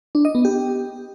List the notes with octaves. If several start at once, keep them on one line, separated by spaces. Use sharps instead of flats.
D4
D#5
B3
G4